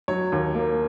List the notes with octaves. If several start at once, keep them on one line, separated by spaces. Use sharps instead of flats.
F#3 C#5
D#2
A#3